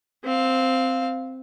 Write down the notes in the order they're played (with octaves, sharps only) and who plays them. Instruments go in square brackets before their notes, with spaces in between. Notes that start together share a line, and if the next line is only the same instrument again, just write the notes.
[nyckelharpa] C4 F5